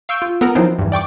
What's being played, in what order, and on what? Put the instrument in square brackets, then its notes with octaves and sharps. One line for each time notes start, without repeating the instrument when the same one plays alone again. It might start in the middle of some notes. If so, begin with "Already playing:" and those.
[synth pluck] F5 C#6 E6 G6 D7
F4
B3 A4 A#4 A#5
F3 F#3 B3 C4 D#4 E4
E2 G2
D5 G5 C#6 D6